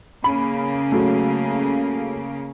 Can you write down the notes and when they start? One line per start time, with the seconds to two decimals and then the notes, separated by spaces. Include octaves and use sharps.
0.24 C#3 A#3 B5
0.92 F#3 A3